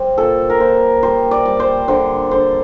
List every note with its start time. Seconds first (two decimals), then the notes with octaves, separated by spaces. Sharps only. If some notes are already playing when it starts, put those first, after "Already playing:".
Already playing: G3 C5
0.18 A#2 A4
0.50 A#4
0.60 A#2 C5
1.03 G3 C5
1.31 D5
1.46 G3
1.60 C5
1.88 D3 C5
2.31 D3 C5